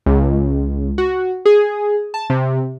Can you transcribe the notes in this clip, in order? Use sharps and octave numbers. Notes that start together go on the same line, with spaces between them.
C#2
F#4
G#4
A5
C3